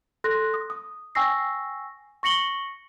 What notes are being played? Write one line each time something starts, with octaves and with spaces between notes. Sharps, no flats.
A4 C6 F#6 A#6
D#6
D#6
G5 G#5 C#6 E6 A#6 C7
C#6 A#6 C#7 F#7 G7